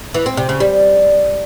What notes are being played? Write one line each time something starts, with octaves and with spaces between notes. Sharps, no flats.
E3
C4
C3
C#3
G3